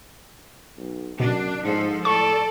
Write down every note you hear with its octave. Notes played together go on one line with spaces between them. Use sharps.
B1
F#2 B2 D4
G#2 F3 A4
A2 A4 D5 C#6